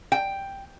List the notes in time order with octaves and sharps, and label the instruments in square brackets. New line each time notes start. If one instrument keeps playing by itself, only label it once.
[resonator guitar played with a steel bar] G5